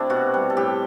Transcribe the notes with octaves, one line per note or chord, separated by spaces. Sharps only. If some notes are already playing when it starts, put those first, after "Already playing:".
Already playing: C3 A3 D4 E4
B2 F#4
G3
A4
A2 G4